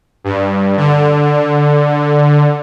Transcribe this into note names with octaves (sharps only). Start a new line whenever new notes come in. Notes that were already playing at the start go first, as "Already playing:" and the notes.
G2
D3